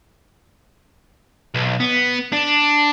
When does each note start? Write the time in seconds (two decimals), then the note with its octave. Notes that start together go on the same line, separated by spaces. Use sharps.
1.55 B1
1.80 B3
2.32 D4